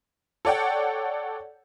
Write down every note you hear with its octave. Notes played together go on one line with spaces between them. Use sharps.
A4 C#5 D5 F#5 G5